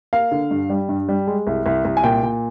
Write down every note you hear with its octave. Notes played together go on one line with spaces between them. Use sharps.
A#3 F5
D3
G2
G3
G2
G3
G#3
C2
C2
C2
G#5
A#2 G5
A#2